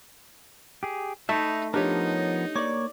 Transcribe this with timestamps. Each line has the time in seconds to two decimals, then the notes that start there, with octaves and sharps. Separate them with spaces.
0.83 G4 G#4
1.29 A3 D#4 E5 B5
1.74 F3 B3 D4 D#4 G4 A#4 C#5
2.55 A#3 C#5 D5 C#6 D6